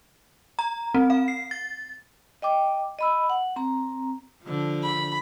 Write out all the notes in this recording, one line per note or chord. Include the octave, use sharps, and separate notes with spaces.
A#5
C4
F5
C7
A6
D#5 G5 D6
D#5 B5 E6
F#5
C4 A#5
D3 F3
B5